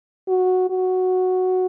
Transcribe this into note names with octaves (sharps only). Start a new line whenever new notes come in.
F#4
F#4